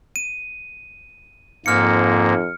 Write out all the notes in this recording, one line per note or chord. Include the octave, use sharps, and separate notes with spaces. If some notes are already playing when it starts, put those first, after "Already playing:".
D#7
F2 G#2 A#3 F6 C#7